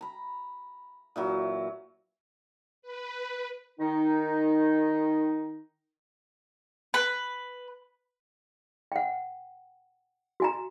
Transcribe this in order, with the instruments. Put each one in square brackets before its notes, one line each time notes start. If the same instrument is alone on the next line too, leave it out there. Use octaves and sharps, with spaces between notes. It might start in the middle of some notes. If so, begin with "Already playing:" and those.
[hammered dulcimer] A#5 B5
A#2 E3 F#3
[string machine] B4
[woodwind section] D#3 D#4
[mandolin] B4
[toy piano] F#5 G5
F#4 G#5 A#5